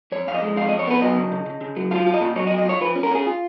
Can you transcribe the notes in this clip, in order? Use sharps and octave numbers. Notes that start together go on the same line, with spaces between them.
F2 C#5
F2 F5
D#5
G#3
F2 F5
F2 D#5
C#5
B3 B4
F#3 D#5
C#3
C#3
C#3
C#3
F#3
F4 F5
F4
D#5
A#2
F#3 C#5
D#5
F#3
D#5
F4 C#5
F3 B4
C#4
A#4
C#4 G#4
F4